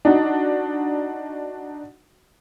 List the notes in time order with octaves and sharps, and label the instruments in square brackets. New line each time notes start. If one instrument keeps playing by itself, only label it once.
[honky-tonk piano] D4 D#4 F#4